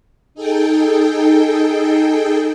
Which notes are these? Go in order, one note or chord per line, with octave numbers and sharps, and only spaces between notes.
D#4 G#4 A4 G5